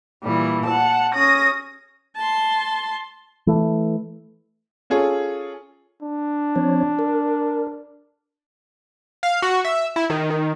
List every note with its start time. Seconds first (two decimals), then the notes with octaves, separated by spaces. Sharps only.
0.24 A#2 E3 G3
0.65 F#5 A5
1.14 C#4 D#6 A#6
2.16 A5 C6
3.47 E3 A3
4.90 C#4 F4 G#4 A4 C#5
6.02 D4
6.56 F3 C4 C#5
6.99 A#4
9.23 F5
9.42 F#4
9.65 E5
9.96 E4
10.10 D#3
10.30 D#3